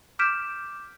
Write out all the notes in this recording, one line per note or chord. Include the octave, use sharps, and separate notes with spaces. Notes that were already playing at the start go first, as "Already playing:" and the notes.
D6 F6 G6 B6 D7 E7